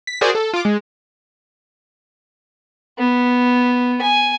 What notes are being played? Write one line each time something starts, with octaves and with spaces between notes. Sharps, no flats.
B6
F#4 G#4 A#4 C5 D5
A4
F4 D6
G#3
B3
G#5